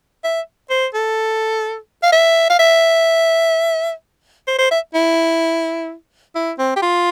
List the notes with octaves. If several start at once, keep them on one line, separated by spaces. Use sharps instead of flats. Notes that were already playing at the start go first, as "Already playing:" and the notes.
E5
C5
A4
F5
E5
F5
E5
C5
C5
E5
E4
E4
C4
G4
F4